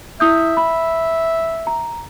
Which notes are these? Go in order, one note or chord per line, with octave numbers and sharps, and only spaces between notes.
E4 E5 D#6 G6
B5
A#5